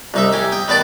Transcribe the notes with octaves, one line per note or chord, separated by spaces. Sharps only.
C2 D#4 E5
G4 G#5
G5 D#6
D#3 B3 D5 A5 D6